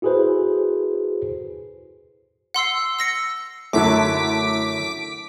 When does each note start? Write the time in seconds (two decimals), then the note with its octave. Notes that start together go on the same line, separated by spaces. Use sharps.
0.02 E4 F#4 G#4 A4 B4 C5
2.54 F#5 C6 E6 C7
2.99 E6 A#6 C#7
3.73 F#2 D3 F#3 A3 E4 A5 D6 B6